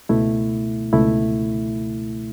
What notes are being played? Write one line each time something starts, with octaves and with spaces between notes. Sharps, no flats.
C#2 B2 A3 E4
C#2 B2 A3 E4